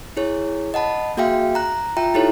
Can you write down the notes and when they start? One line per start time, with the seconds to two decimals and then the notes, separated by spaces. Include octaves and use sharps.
0.17 E4 G#4 C#5
0.74 D#5 F#5 A5 B5
1.17 A#3 F#4 G#4 E5 F5 G5
1.55 A#5 F#6
1.97 F4 E5 G5 A#5
2.14 D#4 E4 G4 A4 C#5